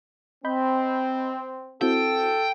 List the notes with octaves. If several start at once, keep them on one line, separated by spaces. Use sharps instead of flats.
C4 D#5 B5 G6
C4 E4 F#4 A4 G5